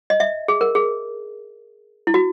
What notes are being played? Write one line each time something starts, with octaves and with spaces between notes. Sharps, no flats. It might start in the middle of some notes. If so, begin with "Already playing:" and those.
D#5
E5
G#4
A#4
G#4
E4
F#4